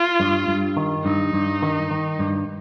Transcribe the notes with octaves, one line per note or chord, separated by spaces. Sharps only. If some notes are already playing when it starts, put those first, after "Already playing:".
Already playing: F4
G2
G2
D#3
G2 D#4
G2
D#3
D#3
G2